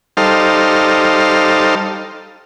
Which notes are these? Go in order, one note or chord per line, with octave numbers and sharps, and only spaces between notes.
G3 D#4 A4 C5 F5